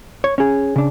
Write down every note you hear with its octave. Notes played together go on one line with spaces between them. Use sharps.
C#5
C#4 G#4
C#3 D4